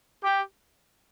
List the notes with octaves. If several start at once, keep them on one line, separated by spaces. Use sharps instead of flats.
G4